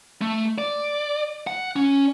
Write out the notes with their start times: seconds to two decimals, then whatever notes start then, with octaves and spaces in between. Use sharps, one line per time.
0.21 A3
0.58 D5
1.47 F#5
1.76 C#4